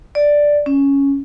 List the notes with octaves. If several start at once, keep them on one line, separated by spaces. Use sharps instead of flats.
D5
C#4